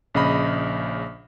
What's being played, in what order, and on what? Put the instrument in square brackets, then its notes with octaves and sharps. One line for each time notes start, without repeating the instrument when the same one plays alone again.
[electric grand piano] A#1 C#3 D#5 B5